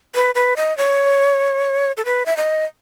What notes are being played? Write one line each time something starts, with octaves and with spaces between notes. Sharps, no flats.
B4
B4
D#5
C#5
A4
B4
E5
D#5